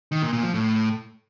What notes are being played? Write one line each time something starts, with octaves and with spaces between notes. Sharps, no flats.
D#3
A#2
A#2
F3
A2